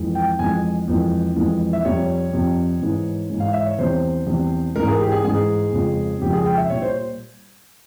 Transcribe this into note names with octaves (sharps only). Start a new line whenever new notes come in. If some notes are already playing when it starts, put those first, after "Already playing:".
Already playing: F2 E3 G#3
G5
F2 E3 G#3 G#5
F2 E3 G#3
F2 E3 G#3
E5
F2 C3 G3 C#5
F2 C3 G3
G#2 E3 G#3
G#2 E3 G#3
F5
E5
C#5
E2 C3 G3 C5
E2 C3 G3
G#2 E3 G#3 A#4
G#4
G4
G#4
G#2 E3 G#3 G#4
F2 C#3 F3 G#3
F2 C#3 F3 G#3 G4
G#4
G5
E5
A#2 G3 C#5
C5